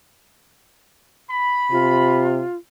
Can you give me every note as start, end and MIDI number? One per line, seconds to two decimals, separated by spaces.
1.30 2.25 83
1.71 2.42 48
1.71 2.56 65